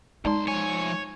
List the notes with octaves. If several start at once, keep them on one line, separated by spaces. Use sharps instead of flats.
B1 G#3 D#4 D5 A#5 C6
F3 C#5 G#5